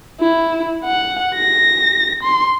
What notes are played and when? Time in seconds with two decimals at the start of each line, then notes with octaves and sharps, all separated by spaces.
0.21 E4
0.85 F#5
1.35 A#6
2.23 C6